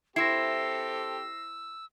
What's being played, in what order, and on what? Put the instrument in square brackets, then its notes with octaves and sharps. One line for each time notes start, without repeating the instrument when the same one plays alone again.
[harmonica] C4 G4 A4 [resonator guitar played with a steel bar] E4 C5 [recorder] E6 [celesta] A#6 C7